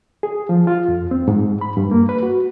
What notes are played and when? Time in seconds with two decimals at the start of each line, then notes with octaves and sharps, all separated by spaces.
0.23 G#4
0.49 F3
0.67 F4
0.88 F2
1.11 C4
1.28 G#2
1.61 B5
1.77 G2
1.91 A#3
2.09 B4
2.23 F#4